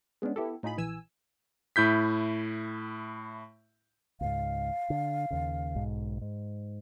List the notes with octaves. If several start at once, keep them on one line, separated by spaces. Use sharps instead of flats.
G#3 B3 C#4 D4
B3 E4 G4 A4
A2 D#4 F4 G#4 B5
A#1 E3 G#5 E6
A2 E4 G6 B6
C#2 G#2 F5
D3
D#2 C#3
B1 G#2
G#2